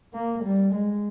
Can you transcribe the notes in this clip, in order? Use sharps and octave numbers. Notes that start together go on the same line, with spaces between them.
A#3
G3
G#3